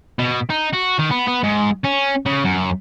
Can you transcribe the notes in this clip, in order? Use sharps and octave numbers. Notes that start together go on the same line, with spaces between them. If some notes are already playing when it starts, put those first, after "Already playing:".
B2
D#4
F#4
D#3
B3
B3
G#2
C#4
C#3
F#2